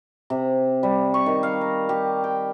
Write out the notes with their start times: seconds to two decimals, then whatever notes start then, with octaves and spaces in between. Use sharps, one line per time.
0.30 C3
0.83 G3
1.14 C#6
1.26 D#3
1.43 F5
1.61 A#5
1.89 G4
2.24 G5